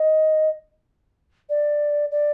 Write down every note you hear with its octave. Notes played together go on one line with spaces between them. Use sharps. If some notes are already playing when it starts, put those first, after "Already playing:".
Already playing: D#5
D5
D5